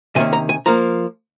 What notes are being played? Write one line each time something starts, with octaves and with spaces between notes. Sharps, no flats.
C3 D#3 A#3 C#4 G#5
A#5
G#5
F3 A#3 A#5